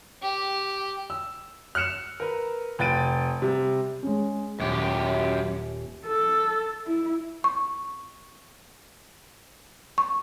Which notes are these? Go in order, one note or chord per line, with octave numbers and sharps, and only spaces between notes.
G4
E6
F6 F#6 C#7 E7 F7
A#4 B4
F1 B4 G5 A6 D7 D#7
C3 G3
G#3 C#4
D#1 F#2 G4
A4
E4
C#6
C#6